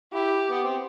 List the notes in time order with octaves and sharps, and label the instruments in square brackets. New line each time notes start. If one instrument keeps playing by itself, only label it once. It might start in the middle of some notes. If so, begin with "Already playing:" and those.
[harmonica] E4 [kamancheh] G4
[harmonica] B3
C4